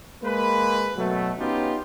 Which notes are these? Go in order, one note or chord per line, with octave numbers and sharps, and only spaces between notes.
G#3 A#3 B4
B2 F#3 A3
B3 C#4 D#4 F4 G4